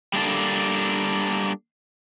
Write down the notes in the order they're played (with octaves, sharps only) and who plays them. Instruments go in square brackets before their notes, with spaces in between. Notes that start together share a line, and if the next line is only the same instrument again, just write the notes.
[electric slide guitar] G3 A#3 D4 A4